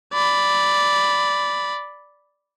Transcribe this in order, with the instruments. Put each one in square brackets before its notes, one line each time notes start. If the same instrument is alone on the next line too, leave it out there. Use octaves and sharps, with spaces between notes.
[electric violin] D5 B5